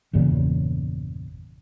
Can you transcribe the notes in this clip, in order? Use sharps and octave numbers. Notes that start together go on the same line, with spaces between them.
G1 E2 A#2 C#3